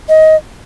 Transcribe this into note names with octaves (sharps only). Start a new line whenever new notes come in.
D#5